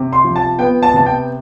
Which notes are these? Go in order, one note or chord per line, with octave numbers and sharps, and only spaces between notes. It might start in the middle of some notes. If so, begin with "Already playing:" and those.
Already playing: C3
C6
F3
A5
B3 G5
A5
C3 A5
G5